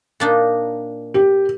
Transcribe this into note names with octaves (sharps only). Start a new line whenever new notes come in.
A#2 D4 D#4
G4